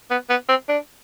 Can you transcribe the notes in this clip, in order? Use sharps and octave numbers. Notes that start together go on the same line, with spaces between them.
B3
B3
C4
D4